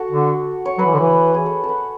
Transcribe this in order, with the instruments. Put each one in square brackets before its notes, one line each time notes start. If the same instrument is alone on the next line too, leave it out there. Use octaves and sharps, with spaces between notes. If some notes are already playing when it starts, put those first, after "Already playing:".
Already playing: [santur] F#4 A4
[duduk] D3
[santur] C#5
[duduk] F#3 [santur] B4
[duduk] E3
D3
E3
[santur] G#4
A4
A4
B4